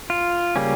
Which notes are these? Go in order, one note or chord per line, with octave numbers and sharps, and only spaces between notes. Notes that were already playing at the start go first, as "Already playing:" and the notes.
F4
C#3 G3 A#3 C#4